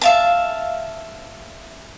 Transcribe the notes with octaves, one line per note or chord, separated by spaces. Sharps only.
E5 F5 A5